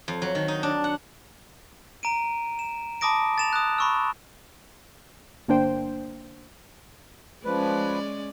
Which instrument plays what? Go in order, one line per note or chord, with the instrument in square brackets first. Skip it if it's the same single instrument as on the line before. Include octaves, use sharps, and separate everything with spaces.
[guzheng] F2
F#3
D#3
D#4
D4
F#5
[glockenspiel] A#5 D7 D#7
E7
A5 B5 D6 D#6 A#6 D7
A6 E7 F7
D#6 F#6
B5 C#6 E6
[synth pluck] G1 A#3 D4 C5 G5
[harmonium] F3 B4 [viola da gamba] G#3 C#4 D5